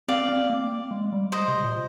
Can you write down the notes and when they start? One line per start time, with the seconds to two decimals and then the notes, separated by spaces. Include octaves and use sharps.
0.08 C4 D5 F5
0.29 C4
0.50 A#3
0.91 G#3
1.12 G3
1.32 C5 D#5
1.48 C3
1.63 A#2